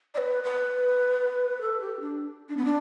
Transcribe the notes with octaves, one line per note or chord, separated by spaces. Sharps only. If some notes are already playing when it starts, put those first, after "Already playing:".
D5
B4
B4
A4
G4
D4
D4
B3
D4